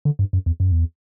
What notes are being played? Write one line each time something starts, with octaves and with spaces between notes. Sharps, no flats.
D3
G2
F#2
E2
F#2
E2